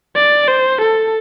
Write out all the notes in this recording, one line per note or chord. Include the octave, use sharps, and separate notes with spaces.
D5
C5
A4